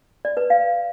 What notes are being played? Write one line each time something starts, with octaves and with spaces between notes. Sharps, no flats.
D5
B4
F5